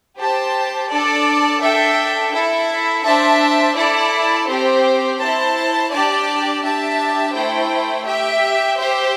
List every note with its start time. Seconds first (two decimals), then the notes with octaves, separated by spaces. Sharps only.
0.17 G4 C5 A5
0.89 D4 A4 D5 A5
1.61 D4 A4 E5 G5
2.33 E4 A4 E5
3.04 D4 C5 E5 A5
3.76 E4 A4 D5 A5
4.48 C4 G4 C5
5.20 E4 C5 A5
5.91 D4 G4 D5 A5
6.63 D4 G4 E5 A5
7.35 A3 E4 C5 G5
8.06 G4 E5 G5
8.78 G4 C5 E5